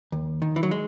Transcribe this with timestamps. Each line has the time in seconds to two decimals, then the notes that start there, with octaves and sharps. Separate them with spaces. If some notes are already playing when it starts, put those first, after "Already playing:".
0.12 D#2
0.42 D#3
0.56 E3
0.63 F#3
0.71 G#3